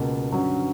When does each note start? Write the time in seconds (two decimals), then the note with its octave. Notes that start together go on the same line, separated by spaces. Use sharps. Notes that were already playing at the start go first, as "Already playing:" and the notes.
Already playing: C#2 B2 A#3
0.30 G2 D3 F#3 C#4